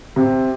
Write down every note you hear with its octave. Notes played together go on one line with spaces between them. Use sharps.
C3